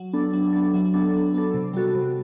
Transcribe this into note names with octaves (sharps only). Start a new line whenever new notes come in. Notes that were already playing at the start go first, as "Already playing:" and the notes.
Already playing: F#3
B3 D4 A4
F#3
B3 D4 A4
F#3
B3 D4 A4
F#3
B3 D4 A4
C3
G3 B3 F#4 A4
C3